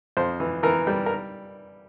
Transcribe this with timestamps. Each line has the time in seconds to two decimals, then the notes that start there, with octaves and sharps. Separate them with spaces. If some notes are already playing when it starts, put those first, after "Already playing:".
0.17 F2 C5
0.40 E3
0.63 E3 A#4
0.87 G3
1.06 A#4